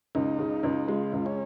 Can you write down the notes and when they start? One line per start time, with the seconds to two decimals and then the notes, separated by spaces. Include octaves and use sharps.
0.15 C#2 D#4
0.39 C#3
0.63 C#2
0.88 G#3 F4
1.13 C#2
1.26 C#4